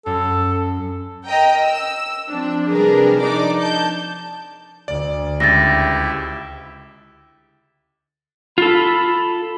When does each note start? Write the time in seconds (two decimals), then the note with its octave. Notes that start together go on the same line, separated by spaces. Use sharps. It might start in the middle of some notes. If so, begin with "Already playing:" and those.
0.06 F#2 A4
1.28 A#4 D#5 G5 A#5
1.62 E6
2.29 F3 C4 D4
2.71 C3 G3 D4 G#4 A#4 B4
3.20 F3 D4 D#4 D5 D6
3.59 A5 G6
4.88 D2 D5
5.40 C#2 E4 G4 E5 A6 A#6
8.58 F4 A4 B5